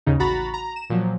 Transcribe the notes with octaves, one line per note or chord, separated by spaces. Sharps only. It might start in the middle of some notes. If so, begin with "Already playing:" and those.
D#2 G#2 C#3 D#4
A1 F#4 A#5 B5 A6
A#5
E7
A#2 F3 F#3